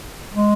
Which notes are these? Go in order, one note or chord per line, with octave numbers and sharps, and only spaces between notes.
G#3